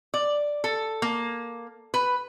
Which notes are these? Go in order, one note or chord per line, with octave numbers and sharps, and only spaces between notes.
D5
A4
A#3
B4